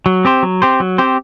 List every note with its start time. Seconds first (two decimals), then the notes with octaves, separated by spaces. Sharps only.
0.06 F#3
0.25 C4 G4 C5
0.43 F#3
0.62 C4 G4 C5
0.80 F#3
0.98 C4 G4 C5